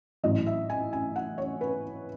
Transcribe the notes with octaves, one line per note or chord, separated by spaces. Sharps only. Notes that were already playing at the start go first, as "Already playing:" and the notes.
A1 A2 F#3 D#5
E5
G#5
G#5
F#5
C#5
B4